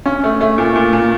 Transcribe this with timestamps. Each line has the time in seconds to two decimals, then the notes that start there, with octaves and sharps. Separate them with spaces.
0.06 C#4
0.24 A3
0.41 A3
0.58 A#2
0.76 A#2
0.93 A#2